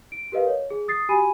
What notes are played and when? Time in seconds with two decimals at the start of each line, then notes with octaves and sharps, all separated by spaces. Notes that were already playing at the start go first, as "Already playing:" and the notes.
0.12 D7
0.32 G4 A#4 B4 D#5 F5
0.47 C#5
0.70 G#4
0.88 D#6 A6 C7
1.09 F#4 G4 G#5 B5 D#7